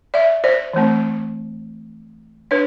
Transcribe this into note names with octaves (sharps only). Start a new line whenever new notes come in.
D5 E5
C5 D5
E3 A3 C4
D4 B4 C#5